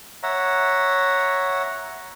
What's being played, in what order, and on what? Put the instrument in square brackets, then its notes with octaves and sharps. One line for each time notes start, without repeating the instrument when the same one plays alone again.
[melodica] C#5 E5 F#5 A#5